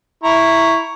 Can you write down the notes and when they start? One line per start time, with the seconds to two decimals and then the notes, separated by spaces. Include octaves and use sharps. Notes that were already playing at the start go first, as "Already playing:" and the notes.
0.24 E4 A#5 C#6